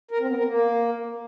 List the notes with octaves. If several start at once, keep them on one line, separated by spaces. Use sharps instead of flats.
A#4
C4
B3
A#4
A#3